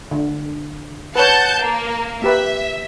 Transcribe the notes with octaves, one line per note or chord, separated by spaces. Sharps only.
D3
B4 C#5 F#5 A5 G6
A#3
A#3 G4 B4 E5